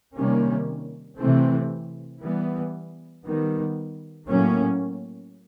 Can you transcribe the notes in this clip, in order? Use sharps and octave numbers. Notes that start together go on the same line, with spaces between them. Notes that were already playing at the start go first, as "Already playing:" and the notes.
C3 D#3 G3 A#3 C#4
C3 E3 A3 C4
E3 G3 B3
D#3 G3 B3
A2 F#3 A#3 C#4